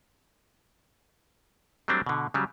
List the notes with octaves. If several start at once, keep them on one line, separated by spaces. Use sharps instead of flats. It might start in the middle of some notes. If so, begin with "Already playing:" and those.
F#3 G3 A3 C4 D4
B2 D3
C#3 F#3 G3